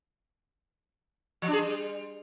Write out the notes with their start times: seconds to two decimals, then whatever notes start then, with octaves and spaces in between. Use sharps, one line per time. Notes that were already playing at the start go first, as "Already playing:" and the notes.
1.42 F3
1.48 D4
1.53 G#4
1.59 G3